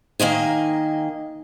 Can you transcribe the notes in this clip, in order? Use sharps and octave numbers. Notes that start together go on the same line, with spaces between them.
D#3 A#3 D#5 G#5